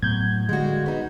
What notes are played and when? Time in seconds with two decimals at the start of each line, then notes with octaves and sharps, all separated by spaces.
0.02 A2 F#3 B3 G6 G#6
0.49 D3 G3 G#3 A#3 F#4
0.86 B3 D#4